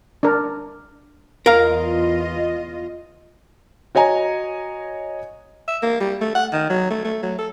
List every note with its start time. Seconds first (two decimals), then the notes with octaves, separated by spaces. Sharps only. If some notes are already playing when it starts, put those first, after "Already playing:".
0.23 D4 A#4
1.46 E2 F4 A#4 D#5 F5
3.95 F#4 C#5 D#5 G#5 A#5
5.68 E5
5.82 A#3
6.00 G3
6.21 A3
6.35 F#5
6.52 D#3
6.70 F#3
6.90 A3
7.04 A3
7.22 F#3
7.38 A4